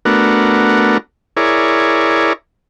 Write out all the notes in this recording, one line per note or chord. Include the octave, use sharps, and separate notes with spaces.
A3 B3 D4 F#4 A#4
E4 G#4 A#4 C#5 D5